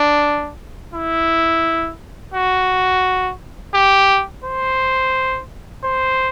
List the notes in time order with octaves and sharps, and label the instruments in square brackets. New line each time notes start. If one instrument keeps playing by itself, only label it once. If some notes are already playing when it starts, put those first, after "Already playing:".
Already playing: [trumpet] D4
E4
F#4
G4
C5
C5